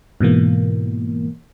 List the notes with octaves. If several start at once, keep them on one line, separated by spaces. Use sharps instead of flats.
G#2 B2 E3 A#3